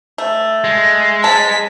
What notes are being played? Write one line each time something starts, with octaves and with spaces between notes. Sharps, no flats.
A3
G#3
A5 B6